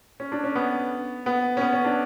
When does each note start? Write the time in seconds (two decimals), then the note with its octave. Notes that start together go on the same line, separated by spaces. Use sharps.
0.20 C#4
0.32 D4
0.44 C#4
0.55 B3
1.26 B3
1.57 C#4
1.61 B3
1.73 C#4
1.85 D4